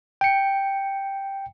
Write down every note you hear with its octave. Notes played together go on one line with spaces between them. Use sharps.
G5 C#7